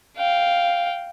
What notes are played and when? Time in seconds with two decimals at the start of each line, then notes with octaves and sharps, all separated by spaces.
0.17 F5 G5